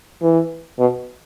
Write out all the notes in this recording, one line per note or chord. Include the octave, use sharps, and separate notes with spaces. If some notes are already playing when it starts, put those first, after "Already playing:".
E3
B2